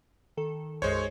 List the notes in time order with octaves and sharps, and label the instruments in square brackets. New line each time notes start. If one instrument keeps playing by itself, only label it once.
[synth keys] D#3 A4
[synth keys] B1 F#2 [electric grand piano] G#3 C5 C#5